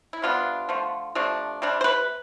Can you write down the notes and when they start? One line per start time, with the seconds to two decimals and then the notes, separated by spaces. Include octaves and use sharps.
0.13 E4
0.22 C3 G3 B3 D4 F4
0.69 D3 F3 A3
1.15 C3 F3 A3 D4
1.62 C3 G3 D4
1.81 C5
1.84 B4